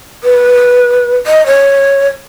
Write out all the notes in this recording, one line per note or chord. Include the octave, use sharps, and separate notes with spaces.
B4
D#5
C#5